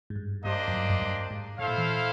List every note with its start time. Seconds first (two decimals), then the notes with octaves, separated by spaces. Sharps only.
0.10 G#2
0.16 G2
0.44 G2 A#3 D4 G4 C5 D#5
0.68 F#2
0.74 G2
0.90 F#2
1.01 G2
1.31 G#2
1.59 A2 E4 A4 C5 F5
1.68 A#2
1.78 E3